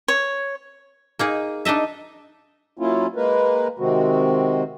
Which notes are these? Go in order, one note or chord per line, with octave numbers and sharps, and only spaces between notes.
C#5
A#3 D#4 G#4
D4 D#4 D#5 E5
F#3 A#3 C#4 E4 F4
G#3 A#3 A#4 B4
C3 D#3 G#3 C4 F#4